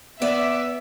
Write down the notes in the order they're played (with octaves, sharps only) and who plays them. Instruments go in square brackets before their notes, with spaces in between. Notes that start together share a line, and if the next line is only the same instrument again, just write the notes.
[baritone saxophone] B3 [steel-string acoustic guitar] B4 D5 [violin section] E5